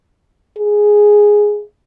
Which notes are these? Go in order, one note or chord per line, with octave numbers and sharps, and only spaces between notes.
G#4